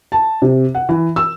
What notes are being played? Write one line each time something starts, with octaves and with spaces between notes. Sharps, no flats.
A5
C3
F#5
E3
E6